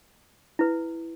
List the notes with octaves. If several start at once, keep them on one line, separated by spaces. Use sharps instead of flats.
E4 B4